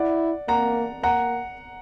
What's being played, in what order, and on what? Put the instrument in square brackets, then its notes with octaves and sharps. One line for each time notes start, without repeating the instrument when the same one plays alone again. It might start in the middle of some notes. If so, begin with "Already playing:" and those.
Already playing: [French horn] E4 [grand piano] D5 F#5
[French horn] A#3 [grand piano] F#5 A#5
[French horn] A#3 [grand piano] F#5 A#5